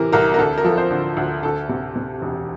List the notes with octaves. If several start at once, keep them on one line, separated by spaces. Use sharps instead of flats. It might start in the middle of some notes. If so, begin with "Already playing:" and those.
Already playing: C3 E3 A#4
C2 A#4
A#4
D2 A4
A#4
F3 A4
C5
D3
D2
D2 A4
C3
C3
E1